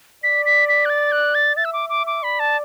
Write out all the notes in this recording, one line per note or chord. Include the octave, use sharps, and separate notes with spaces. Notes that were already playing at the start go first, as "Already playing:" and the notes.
D5 B6
B6
B6
F#6
A6
F#6
A6
E5 A6
E6
D6
D6
D6
D5 B5
A5